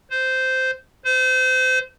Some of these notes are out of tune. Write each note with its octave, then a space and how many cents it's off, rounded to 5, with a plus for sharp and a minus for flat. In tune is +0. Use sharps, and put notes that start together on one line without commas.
C5 -10
C5 -30